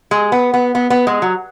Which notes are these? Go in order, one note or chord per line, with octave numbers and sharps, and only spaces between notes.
G#3
B3
B3
B3
B3
G#3
F#3